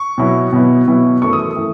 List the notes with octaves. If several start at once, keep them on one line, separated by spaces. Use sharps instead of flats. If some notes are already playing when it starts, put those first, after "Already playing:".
Already playing: C#6
B2 F#3 B3 E4
B2 F#3 B3 E4
B2 F#3 B3 E4
F#2 E3 A3 C#6
D#6
E3 A3